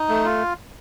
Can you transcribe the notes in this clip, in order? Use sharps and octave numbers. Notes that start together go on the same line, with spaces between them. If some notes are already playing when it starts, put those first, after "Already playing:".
Already playing: D#4
A3
F4